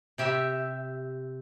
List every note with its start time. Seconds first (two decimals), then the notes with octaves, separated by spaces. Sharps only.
0.18 C3 G4 E5